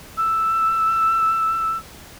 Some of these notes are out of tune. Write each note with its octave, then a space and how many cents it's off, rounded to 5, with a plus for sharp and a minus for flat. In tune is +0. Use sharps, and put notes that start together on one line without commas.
E6 +0